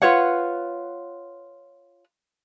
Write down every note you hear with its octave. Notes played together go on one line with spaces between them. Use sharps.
F4 B4 C#5 F#5